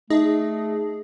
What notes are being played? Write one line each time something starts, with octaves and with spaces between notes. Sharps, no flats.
A3 D#4 G#4